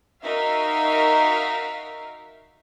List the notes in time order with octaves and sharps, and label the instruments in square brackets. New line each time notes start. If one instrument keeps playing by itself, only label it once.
[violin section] D#4 F#4 A#4 E5 F5